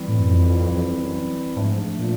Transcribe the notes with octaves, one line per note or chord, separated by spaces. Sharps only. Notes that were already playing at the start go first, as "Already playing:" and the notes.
Already playing: E3 G3 C4 E4
A2
F#2
F2
F2
F2
F#2
G#2 F3 A3 D4
A#2